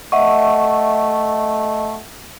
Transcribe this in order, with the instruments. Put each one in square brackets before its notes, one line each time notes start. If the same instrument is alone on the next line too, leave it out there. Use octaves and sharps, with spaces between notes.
[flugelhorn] A3 [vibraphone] D#5 [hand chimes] E5 F#5 C#6